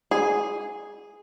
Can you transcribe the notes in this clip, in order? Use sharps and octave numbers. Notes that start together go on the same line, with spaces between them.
G#4